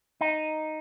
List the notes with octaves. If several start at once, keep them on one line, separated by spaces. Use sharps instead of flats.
D#4